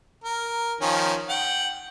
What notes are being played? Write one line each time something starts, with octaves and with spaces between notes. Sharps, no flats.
A#4
D#3 F3 C#4
F#5 G5